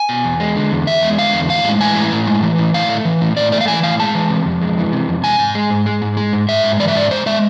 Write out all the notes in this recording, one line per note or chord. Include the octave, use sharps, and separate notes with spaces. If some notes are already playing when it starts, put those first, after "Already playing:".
Already playing: G#5
B2
E2
G#3
D3
E2
E2 E5
G#3
D3 F5
E2
A2 F5
G#3
E3 G#5
A2
A2
G#3
E3
A2
A2 F5
A3
E3
A2
A2 D5
A3 D5
F5
E3 G#5
A2 F5
G#3 A5
E3
C3
F2
G#3
E3
C3
F2
G#3 G#5
G#2
G#3
G#2
G#3
G#2
G#3
G#2
G#2 E5
G#3
E3 D5
E5
G#2 D5
G#2 C5
G#3 E5